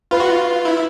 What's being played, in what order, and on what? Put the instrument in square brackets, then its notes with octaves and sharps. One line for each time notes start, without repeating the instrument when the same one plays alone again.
[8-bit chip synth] F4 [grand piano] B4
[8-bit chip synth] F#4
F4
E4